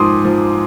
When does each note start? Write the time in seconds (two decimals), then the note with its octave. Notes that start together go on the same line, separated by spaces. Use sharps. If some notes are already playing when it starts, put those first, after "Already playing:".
Already playing: G#2 F3 G#3 C6 D6 D#6
0.24 F3